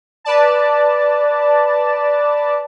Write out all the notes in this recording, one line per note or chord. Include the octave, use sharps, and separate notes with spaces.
B4 D5 A5